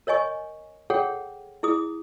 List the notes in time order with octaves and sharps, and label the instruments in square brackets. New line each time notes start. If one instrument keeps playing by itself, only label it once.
[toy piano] A#4 C#5 D#5 G#5 C#6
G#4 A4 C#5 F#5 G5
E4 G#4 D#6